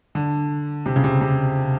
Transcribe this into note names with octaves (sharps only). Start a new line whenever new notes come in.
D3
C3
C#3
C3
C3